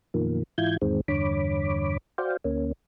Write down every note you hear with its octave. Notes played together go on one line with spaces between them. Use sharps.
F#2 B2 D#3 F3 A#3
G#2 E3 E4 F4 G6 G#6
E2 G#2 D#3 G#3 C4
E2 G2 D3 C#5 B5 D6
F#4 C5 D5 F5 G5
D2 A#3 C#4